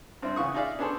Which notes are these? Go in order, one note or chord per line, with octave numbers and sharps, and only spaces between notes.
G2 C4 E4
C#3 E3 F#5 C#6 D#6
D#4 F4 G#4 D5 E5 F5
B3 C#4 D4 G#4 A4 C5